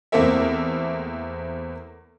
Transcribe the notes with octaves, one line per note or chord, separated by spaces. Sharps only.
E2 A3 A#3 C4 A#4 E5